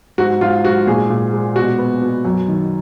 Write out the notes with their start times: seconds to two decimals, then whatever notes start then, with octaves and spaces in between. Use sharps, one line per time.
0.18 G#2 F#4
0.41 G#2 F4
0.64 G#2 F#4
0.87 A#2 G#4
1.10 A#2
1.33 G#3
1.56 B2 F#4
1.79 B3
2.02 B2
2.25 F#2
2.48 D#3